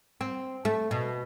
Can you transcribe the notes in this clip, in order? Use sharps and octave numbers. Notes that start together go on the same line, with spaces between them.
C4
A3
B2